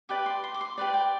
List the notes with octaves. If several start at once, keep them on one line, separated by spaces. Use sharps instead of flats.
G4 B4 D5 D6
C6
C6
D6
C6
G4 B4 D5
G5